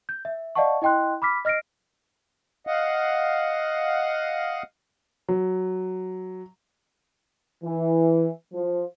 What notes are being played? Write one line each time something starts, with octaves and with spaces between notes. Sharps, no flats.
G6
E5
D5 D#5 F5 F#5 A5 C#6
E4 D#5 G5 C6 F#6
B5 D6 F6 B6
D#5 F6 A#6 C7 D7
D#5 F5 F#5
F#3
E3
F3